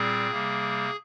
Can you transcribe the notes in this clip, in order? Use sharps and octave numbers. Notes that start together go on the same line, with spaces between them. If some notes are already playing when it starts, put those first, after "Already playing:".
Already playing: A#2 G3 C4 G#4
C3 G3 A#3